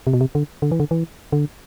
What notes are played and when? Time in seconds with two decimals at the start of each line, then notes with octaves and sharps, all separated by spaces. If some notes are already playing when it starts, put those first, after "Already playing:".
0.07 C3
0.13 B2
0.21 C3
0.35 D3
0.62 D3
0.72 E3
0.80 D3
0.91 E3
1.32 D3